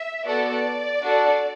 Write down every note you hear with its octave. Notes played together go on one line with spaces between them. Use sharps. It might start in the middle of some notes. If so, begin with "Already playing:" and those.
Already playing: E5
B3 F#4 A4 D5
D4 F#4 A4